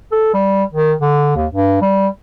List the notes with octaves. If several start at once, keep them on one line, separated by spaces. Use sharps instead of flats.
A4
G3
D#3
D3
D#2
G2
G3